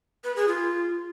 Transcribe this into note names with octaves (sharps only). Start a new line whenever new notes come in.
B4
G#4
F4